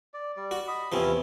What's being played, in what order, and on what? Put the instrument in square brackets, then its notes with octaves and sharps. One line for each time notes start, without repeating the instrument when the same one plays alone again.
[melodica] D5
G3 D5
[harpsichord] F#4
[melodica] D#5 B5
[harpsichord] E2 C3 F3 [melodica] C#4 E4